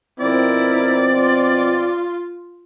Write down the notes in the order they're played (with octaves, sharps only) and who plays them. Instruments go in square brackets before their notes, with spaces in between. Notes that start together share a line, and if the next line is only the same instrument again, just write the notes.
[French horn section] B2 F3 C4 [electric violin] E4 A#4 [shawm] D5
[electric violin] F4